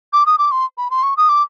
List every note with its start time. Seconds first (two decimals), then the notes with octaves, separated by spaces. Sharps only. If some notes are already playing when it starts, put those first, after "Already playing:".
0.13 D6
0.26 D#6
0.38 D6
0.52 C6
0.78 B5
0.91 C6
1.03 C#6
1.17 D#6
1.29 D6